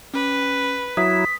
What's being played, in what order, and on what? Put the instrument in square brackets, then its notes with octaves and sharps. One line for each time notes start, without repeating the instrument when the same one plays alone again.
[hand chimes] C#4 [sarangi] B4
[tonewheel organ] F#3 E4 [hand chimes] D#6 [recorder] B6